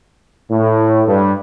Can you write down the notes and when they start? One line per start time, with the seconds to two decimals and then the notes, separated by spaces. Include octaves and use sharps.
0.51 A2
1.08 G2